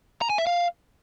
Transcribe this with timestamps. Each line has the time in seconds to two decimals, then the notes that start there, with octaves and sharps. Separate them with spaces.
0.22 A#5
0.30 G#5
0.38 E5
0.47 F5